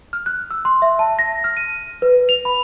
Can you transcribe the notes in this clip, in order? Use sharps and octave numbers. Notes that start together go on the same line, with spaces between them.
F6
F#6
E6
C6
E5
A5
A#6
F6
D#7
B4
F7
B5